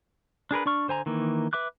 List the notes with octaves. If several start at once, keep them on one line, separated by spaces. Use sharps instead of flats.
D4 G#4 A#4 B4
D4 D5 C#6 F6
D3 C5 G#5 A#5
D#3 E3 A#3
B4 E5 D6 F#6